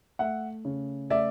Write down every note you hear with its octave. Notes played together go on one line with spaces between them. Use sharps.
A3 E5 F#5
C#3
A3 D5 E5